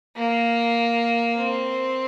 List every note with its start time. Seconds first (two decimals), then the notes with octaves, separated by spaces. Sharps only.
0.17 A#3
1.37 C4